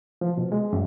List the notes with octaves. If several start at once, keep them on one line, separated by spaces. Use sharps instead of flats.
F3
B2
G#3
F#2